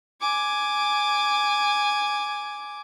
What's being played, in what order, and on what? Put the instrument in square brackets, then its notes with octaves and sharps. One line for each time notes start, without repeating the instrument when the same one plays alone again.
[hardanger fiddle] G#5 D6